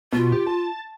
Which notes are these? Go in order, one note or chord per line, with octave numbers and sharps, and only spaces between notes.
B2 F4
G4
A5